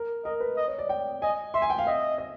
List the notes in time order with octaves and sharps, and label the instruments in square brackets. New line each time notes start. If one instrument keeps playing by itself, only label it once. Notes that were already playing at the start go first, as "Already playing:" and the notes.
Already playing: [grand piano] A#4
[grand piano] A#4 [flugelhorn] D#5
[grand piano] B4
[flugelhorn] D#5
[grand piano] C#5
D5
G5
[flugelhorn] D#5 [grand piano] G#5
[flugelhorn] E5 [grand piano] C6
[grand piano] G#5
G5
F5
[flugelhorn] D#5 [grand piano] E5
[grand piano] D#5